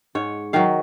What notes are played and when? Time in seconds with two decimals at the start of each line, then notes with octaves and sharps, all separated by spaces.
0.15 G#2 C#5
0.53 D#3 F#3 F5